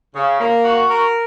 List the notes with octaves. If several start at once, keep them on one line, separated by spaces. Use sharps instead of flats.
C#3
A#3
F#4
A#4